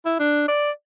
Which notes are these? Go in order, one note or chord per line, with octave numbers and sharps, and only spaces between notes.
E4
D4
D5